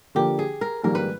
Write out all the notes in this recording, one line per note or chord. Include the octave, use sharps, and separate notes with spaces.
D3 F3 A#3 D4 G4
G#4
A#4
A#1 G#2 D#3 G3 A#3 A#4
B4